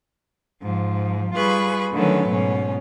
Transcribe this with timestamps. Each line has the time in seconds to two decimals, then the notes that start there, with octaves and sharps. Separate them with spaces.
0.61 G#2 F3
1.35 G3 F4 G#4 B4 B5 C#6
1.93 D3 D#3 F#3 A3 C#4 B4
2.29 G#2 B2 C#4